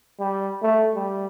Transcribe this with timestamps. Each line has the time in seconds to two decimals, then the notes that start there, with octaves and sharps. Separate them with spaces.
0.19 G3
0.62 A3
0.95 G3